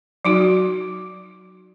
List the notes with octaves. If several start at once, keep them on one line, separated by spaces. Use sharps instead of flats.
F#3 D#4 F#4